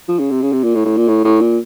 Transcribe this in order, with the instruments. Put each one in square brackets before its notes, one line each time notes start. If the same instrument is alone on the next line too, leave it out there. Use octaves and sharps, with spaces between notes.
[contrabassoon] F3
C#3
C3
C#3
C3
A#2
A2
A2
A#2
A2
A2
A#2